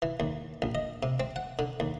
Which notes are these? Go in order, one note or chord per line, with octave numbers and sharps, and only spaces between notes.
E3
D#2
A#1
D#5
C3
C4
F#5
D3
D#2